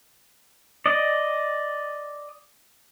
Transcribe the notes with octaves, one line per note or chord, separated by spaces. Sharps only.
D5 D#5